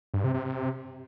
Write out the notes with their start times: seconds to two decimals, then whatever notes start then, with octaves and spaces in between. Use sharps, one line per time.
0.14 G2
0.24 C3
0.34 C3
0.45 C3